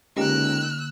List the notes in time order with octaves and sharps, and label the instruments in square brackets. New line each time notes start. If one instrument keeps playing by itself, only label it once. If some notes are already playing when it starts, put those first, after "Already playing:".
[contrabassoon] C#2 [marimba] D3 A#3 [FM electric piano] D#4 G4 A#4 [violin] E6 F#6